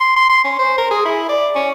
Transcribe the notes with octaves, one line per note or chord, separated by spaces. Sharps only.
C6
C6
C6
C#4
C5
A#4
G#4
E4
D5
C#4